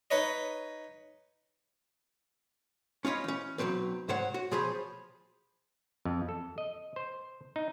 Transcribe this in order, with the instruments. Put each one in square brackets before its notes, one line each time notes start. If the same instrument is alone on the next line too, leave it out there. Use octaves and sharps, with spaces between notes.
[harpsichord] D#4 B4 C#5 D#5
[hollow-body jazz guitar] C#4 F4 C#5 D#5 B5
E3 C#4
B1 A#2 F#3 C4 B4
G#2 C3 C5 C#5 F#5
F#4
B2 F3 G#4 C5 C#5 B5
[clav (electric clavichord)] F2
A4
D#5
C5
D#4